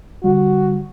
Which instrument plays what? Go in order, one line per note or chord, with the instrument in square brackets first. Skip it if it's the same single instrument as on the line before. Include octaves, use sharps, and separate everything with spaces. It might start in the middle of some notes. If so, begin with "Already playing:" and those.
[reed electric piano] D3 G3 [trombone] F#4